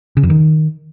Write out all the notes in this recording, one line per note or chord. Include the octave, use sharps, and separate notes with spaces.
C#3
F2
D#3